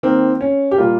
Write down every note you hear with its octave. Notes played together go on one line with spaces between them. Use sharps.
D#3 A#3 C4
C#4
G4
A#2 G3 A#3 F4